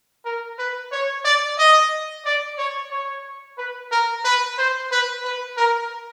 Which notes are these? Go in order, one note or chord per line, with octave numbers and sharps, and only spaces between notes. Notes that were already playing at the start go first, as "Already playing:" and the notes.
A#4
B4
C#5
D5
D#5
D5
C#5
C#5
B4
A#4
B4
C5
B4
B4
A#4